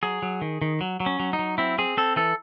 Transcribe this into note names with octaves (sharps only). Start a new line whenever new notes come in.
F#3 G#4
F#3
D#3
D#3
F#3
F#3
C#4
F#3
D#4
F#3
C4 E4
C4 G#4
C4 A4
E3 A4